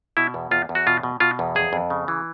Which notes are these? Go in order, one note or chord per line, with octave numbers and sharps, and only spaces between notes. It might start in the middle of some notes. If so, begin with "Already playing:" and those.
B2 E4
E2
E2 F4
E2
F#4
B2 F4
B2
B2 F4
E2
F2 G#4
F2
C#3
E3